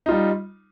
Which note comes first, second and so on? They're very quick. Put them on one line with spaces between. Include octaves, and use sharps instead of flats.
D#4 F4 G3